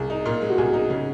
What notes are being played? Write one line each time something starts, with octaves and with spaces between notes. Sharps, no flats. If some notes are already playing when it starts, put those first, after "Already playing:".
Already playing: C2 G#4
D#4
A#2 A#4
G#3
F#4
C2 G#4
D#4
C#3